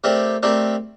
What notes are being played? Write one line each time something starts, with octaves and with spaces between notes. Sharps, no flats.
A3 C4 G4 A#4 D5
A3 C4 G4 A#4 D5